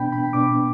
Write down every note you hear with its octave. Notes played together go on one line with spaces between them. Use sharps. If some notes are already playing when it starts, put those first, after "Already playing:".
Already playing: B2 B3 D4 G5 B5
B5
B2 B3 D4 D6